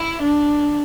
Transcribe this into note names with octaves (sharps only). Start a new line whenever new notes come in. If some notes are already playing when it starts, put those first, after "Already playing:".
Already playing: E4
D4